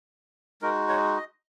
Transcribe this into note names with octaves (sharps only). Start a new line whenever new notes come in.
G#3 D#4 F#4 A#4
C#5
D#5